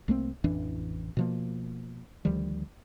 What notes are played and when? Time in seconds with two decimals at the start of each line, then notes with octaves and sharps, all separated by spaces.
0.08 C2 A3 A#3 C4
0.44 A1 F2 E3 D4
1.17 B2 F3 A#3
2.25 D2 D#3 F3 G3